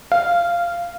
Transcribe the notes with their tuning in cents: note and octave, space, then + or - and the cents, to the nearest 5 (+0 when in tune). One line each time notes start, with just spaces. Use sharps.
F5 -10